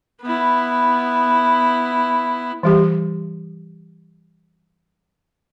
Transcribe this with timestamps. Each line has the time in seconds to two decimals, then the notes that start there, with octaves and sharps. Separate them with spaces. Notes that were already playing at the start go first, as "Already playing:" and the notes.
0.22 B3 E4
2.63 E3 G3 G4